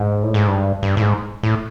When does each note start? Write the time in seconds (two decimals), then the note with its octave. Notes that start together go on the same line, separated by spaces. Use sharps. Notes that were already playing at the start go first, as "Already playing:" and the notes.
Already playing: G#2
0.23 A2
0.34 G#2
0.47 G2
0.83 G2
0.97 A2
1.01 G#2
1.43 A2